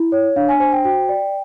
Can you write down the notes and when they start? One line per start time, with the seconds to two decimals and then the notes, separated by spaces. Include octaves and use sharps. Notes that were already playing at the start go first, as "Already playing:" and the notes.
Already playing: E4
0.12 C#5
0.36 D4 F5
0.49 G#5
0.60 C5 G#5
0.73 G5
0.84 F#4 G5
1.09 D5